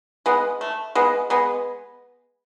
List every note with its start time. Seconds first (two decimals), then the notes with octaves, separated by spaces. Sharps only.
0.26 G#3 B3
0.61 A3
0.95 G#3 B3
1.30 G#3 B3